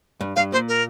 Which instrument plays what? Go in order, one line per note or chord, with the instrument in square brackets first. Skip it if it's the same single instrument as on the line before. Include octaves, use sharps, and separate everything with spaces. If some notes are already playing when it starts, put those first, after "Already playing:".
[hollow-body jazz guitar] G2
[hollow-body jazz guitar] G2 [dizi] F5
[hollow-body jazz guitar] A#2 [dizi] C5
[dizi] A#4